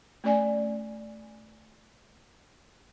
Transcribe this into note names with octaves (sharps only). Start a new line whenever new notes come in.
A3 C#4 D5 G#5